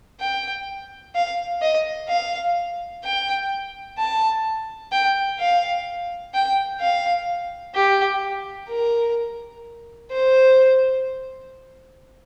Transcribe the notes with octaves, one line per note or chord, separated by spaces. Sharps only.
G5
F5
D#5
F5
G5
A5
G5
F5
G5
F5
G4
A#4
C5